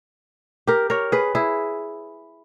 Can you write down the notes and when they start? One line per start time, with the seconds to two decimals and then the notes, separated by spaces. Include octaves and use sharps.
0.67 G4 A#4
0.90 A#4 C#5
1.12 G#4 B4
1.35 E4 G#4